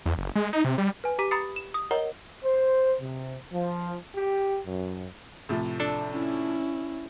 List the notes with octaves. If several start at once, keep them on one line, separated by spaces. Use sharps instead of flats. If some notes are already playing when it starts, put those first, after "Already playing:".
E2
F#1
G#3
D#4
C3
G3
B4 G#5
G4 A#5 D6 B6 D#7
A#5 B5 D#6 A6 C7 C#7
E7
D#6
A#4 C#5 D#5 F#5 A#5 G7
C5
C3
F3
G4
F#2
A2 C3 F3
D4 A4
C#4 E4